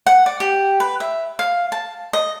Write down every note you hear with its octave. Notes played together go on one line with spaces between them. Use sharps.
F#5
D5
G4
B4
E5
F5
A5
D#5